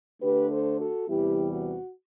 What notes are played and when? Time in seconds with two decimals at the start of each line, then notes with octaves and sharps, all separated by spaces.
0.22 D3 A3 D4 G4 B4
0.51 A4 C5
0.80 F#4 A4
1.08 E2 C3 E3 G3 B3 E4 G4
1.52 F#4